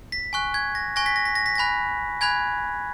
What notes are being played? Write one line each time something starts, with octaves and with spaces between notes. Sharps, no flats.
B6
G#5 C#6 F#6
G#6
A#6
G#5 C#6 F#6 A#6
B6
A#6
B6
A#6
B6
G#5 B5 F#6 A#6
G#5 B5 F#6 G#6